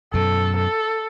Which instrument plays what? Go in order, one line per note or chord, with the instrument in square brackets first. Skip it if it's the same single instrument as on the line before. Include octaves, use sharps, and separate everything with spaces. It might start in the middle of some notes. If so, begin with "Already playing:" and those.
[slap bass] F#2 B2 [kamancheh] A4
[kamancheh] A4